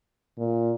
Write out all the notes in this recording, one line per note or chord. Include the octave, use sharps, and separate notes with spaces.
A#2